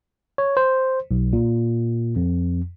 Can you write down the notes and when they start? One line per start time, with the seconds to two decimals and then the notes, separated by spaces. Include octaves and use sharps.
0.38 C#5
0.57 C5
1.11 B1
1.33 A#2
2.16 F2